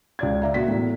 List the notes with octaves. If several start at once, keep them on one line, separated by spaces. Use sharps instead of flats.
C#2 D5 G#6
D5 E5 A#5
A#2 F#4 B6
E2 A2